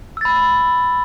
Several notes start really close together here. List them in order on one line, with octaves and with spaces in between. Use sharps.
E6 A6 B5